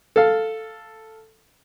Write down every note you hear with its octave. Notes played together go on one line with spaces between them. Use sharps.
A4 F5